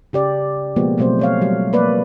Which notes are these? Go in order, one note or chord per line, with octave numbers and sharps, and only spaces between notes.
C#3 G4 D5
B2 F3 G#3 A#3 B3 G4
B2 F#3 A3 C4 C5
C4 C#5 F5
F#3 G3
A#3 B4 D5